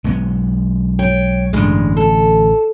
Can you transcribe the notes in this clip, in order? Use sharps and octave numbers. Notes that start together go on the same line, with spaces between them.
B1 G#3 B3
C#5 G5
A1 G2 D3 G#3
A4